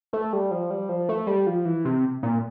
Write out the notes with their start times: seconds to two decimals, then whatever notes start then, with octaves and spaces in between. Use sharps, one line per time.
0.13 A3
0.33 G3
0.51 F3
0.70 G3
0.89 F3
1.09 A3
1.27 G3
1.47 F3
1.65 E3
1.85 C3
2.23 A#2